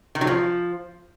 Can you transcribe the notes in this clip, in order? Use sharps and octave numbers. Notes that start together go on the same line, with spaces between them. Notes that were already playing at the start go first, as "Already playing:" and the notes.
D#3
F#3
F3